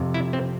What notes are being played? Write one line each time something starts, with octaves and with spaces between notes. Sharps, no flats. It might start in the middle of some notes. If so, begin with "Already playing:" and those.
Already playing: F2 C3
E4
C4